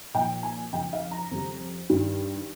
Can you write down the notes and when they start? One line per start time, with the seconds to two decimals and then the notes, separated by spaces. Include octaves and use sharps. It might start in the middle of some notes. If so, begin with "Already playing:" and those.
0.14 A#2 F3 G5
0.43 G#5
0.73 F2 C#3 F3 G5
0.93 F5
1.11 A#5
1.31 F2 C#3 G3
1.90 G2 D#3 G3